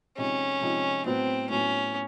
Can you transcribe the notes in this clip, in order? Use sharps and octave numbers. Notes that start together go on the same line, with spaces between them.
C3 F3 G#3 C4 C#4 D#4
C3 F3 G#3 C4 D#4
A2 F#3 B3 C4
A2 F#3 B3 C#4